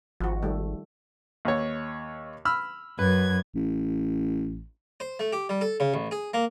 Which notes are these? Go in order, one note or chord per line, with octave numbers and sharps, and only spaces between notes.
G#1 F3 F#4
D#3 G3 A3
D#2 C#5
B5 E6 F6
F#2 B4 G#6
A1
C5
A3
G4
G3
A4
C#3
A1
G#4
A#3